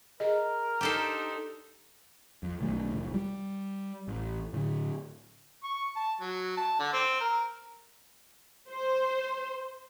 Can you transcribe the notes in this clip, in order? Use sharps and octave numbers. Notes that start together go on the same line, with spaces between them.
G#4 A#4 D#5
D4 D#4 G4 A4 C5
F2
B1 D#3 A3
F1 A#1
G3
A1
A2 D3
C#6
A5
F#3
A5
D3
C4
A#4
C5